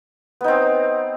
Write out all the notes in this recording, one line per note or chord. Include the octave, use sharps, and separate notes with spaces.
B3 C4 D#4